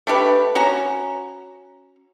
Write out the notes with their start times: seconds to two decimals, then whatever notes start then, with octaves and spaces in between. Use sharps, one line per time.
0.07 A3 D4 G4 B4
0.55 C#4 F#4 A#5